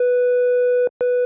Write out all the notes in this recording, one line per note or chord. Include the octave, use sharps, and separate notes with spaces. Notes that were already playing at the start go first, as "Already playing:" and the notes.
Already playing: B4
B4